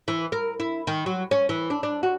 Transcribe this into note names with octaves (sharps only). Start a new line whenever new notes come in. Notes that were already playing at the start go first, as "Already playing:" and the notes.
E3
A#4
E4
D#3
F#3
C#4
E3
D4
D4
F#4